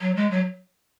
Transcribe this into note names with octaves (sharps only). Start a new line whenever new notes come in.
F#3
G#3
F#3